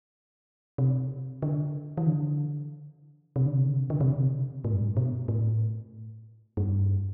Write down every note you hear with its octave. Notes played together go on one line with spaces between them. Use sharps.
C3
D3
E3
D3
C3
D3
C3
D3
C3
D3
C3
D3
C3
A2
G2
A2
B2
A2
G2